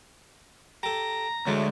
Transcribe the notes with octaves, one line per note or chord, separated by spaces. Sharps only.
G4 A4 A#5
D2 F#3 G#3 A3